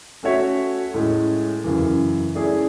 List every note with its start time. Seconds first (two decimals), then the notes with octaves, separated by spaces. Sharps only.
0.23 A3 C#4 F#4 C#5 E5
0.94 A2 G#3 C#4
1.64 F#2 C#3 E3
2.35 A3 C#4 E4 G#4 D5